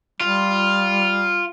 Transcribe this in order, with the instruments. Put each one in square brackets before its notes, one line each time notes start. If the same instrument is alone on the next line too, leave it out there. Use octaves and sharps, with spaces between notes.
[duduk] G3 [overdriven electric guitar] F4